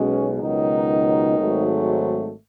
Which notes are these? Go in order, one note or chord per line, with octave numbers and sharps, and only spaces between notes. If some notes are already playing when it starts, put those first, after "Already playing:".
Already playing: B1 B2 G#3 C#4
C#2 B2 D#3 F#3 D#4
G#1 G#2 F#3 A3